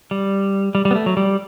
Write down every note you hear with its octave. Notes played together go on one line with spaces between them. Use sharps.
G3
G3
G3
B3
A3
F#3
G3